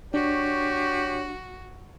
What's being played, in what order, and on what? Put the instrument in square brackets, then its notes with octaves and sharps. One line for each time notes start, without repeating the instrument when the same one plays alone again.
[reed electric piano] D4 [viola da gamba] F#4 [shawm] G4 [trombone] C#5